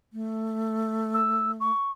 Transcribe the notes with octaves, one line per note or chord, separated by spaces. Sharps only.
A3
E6
C#6